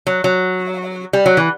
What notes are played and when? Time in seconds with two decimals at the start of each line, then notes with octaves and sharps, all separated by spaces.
0.07 F#3
0.24 F#3
1.13 G3
1.26 F#3
1.37 E3